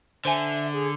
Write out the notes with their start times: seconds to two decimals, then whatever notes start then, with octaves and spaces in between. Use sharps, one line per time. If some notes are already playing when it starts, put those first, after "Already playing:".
0.25 D3 C5 E5 G#5
0.74 G#4